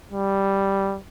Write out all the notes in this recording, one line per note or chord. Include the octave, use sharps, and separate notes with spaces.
G3